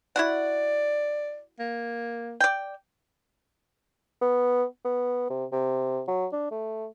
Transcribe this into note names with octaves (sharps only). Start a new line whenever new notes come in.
E4 F#4 D5 F#5
A#3
D5 G5
B3
B3
C3
C3
F#3
D4
A3